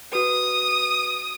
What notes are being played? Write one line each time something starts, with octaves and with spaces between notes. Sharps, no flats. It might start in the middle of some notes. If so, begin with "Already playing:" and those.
F#4 B4 D#6